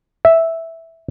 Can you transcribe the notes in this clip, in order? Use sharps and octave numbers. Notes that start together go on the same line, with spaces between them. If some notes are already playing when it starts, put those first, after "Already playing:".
E5